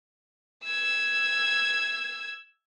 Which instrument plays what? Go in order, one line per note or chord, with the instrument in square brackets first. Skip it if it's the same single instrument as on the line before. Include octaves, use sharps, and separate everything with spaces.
[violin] E6 G#6